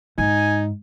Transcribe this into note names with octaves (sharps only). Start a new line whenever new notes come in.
G#2 D#4 G#5